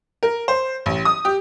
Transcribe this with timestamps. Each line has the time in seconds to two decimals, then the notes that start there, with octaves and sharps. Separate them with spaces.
0.23 A#4
0.48 C5
0.86 A1
1.05 D#6
1.25 G4